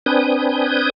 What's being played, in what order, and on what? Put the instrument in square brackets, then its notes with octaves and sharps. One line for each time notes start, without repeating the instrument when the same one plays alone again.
[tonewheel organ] C4 D4 B4 G#5 D#6 G6